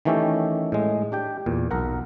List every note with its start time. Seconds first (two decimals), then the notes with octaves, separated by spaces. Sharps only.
0.05 D#3 E3 A3 C#4 G4 A4
0.72 A2 G#3
1.12 D4 G4 G5
1.46 E2 A#2
1.71 B1 A#4 F#5